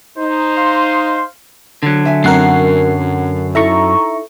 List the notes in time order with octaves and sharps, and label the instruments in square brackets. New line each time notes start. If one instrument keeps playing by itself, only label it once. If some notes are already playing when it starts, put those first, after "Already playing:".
[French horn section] D#4 [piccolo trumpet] C5
[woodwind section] F5 C6
[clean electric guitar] D3 F#3
[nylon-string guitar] E5 G#5
[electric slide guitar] F#2 [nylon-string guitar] C4 C#4 [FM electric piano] A#4 F#5 C7
[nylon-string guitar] D#4 E4 A4 [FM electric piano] E5 A#5 C#6